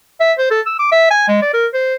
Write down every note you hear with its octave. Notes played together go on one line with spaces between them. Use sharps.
E5
C5
A4
E6
D6
E5
G#5
G#3
D5
A#4
C5